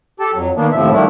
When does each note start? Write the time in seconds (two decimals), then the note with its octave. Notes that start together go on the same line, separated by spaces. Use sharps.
0.20 G4 A4 A5
0.34 F2 F#3
0.56 D#3 A#3 B3 D4
0.72 D#2 A2 C3 F3 E5
0.92 D#3 F3 G3 A3 D4 E4